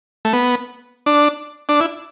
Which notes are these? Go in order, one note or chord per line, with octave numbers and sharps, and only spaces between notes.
A3
B3
D4
D4
E4